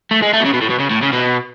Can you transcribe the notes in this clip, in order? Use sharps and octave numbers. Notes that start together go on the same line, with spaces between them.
A3
G#3
A3
B2
C#3
B2
A2
B2
C#3
A2
C#3
B2